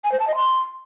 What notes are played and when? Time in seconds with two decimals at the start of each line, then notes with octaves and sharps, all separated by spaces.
0.04 G#5
0.12 C5
0.20 A5
0.27 D#5
0.35 C6